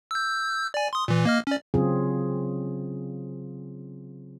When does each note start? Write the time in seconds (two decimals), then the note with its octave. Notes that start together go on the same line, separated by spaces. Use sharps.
0.11 E6 G6
0.74 D5 G#5
0.93 C6 D#6
1.08 A#2 E3
1.25 A#3 D#5 F6
1.47 C#4 D5
1.74 C#3 F#3 C4 F4 G#4